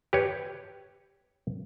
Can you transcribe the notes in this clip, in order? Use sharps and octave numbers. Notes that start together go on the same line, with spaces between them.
G4 B4 C#5